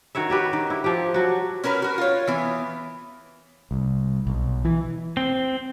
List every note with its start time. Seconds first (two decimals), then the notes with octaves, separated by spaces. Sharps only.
0.15 D#3 F#4 C#5 E5
0.30 F#4 G4 B4
0.53 D#3
0.70 E4
0.84 F3 G4
1.14 F#3 F#4
1.64 C#4 F#4 A#4 B4
1.82 F#4 A#4
1.98 F4 C#5
2.27 E3 B3
3.71 C2
4.27 B1
4.65 E3
5.17 C4